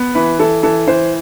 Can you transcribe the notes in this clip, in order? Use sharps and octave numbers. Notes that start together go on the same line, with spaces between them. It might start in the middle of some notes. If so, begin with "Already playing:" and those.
Already playing: B3
E3 B4
E3 A4
E3 A4
E3 C5